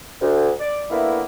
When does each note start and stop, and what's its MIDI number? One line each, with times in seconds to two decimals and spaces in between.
0.21 0.50 38
0.60 0.84 74
0.90 1.21 50
0.90 1.21 58
0.90 1.21 59
0.90 1.21 64